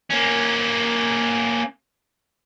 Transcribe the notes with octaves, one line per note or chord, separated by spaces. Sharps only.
A#3 C#4